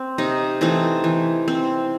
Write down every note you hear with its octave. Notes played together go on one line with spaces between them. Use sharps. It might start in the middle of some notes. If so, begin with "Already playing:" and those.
Already playing: C4
C3 D#4
E3 A3 C4 D#4
E3
C4